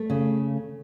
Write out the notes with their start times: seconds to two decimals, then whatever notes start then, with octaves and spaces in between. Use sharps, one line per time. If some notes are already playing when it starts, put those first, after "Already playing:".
Already playing: A3
0.10 C#3